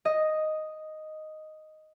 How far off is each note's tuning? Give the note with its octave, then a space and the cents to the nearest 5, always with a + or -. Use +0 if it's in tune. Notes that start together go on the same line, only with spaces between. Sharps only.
D#5 +0